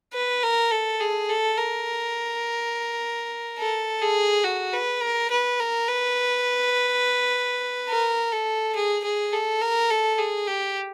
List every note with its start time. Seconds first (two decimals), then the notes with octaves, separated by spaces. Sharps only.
0.14 B4
0.43 A#4
0.71 A4
1.00 G#4
1.29 A4
1.58 A#4
3.58 A4
4.02 G#4
4.44 F#4
4.73 B4
5.02 A#4
5.31 B4
5.60 A#4
5.88 B4
7.89 A#4
8.32 A4
8.75 G#4
9.04 G#4
9.33 A4
9.61 A#4
9.90 A4
10.18 G#4
10.47 G4